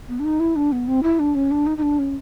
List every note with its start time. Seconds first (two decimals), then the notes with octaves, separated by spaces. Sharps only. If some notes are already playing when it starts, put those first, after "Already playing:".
0.08 B3
0.19 D4
0.24 D#4
0.40 E4
0.56 D4
0.72 B3
0.87 C4
1.03 E4
1.19 D4
1.35 C#4
1.51 D4
1.66 D#4
1.78 D#4
1.82 D4
1.99 C#4